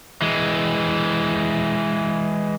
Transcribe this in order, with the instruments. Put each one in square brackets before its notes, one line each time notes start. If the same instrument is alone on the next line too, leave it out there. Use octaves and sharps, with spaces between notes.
[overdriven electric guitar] E3 G#3